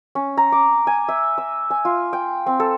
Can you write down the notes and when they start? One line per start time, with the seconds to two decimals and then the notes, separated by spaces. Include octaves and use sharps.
0.15 C#4
0.37 A#5
0.52 D6
0.87 G#5
1.08 E5
1.38 E6
1.70 G#5
1.85 F4
2.13 G5
2.46 C4
2.60 A4